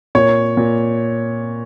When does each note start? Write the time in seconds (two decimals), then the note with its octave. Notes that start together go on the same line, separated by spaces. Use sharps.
0.15 A#2 C#5
0.57 A#2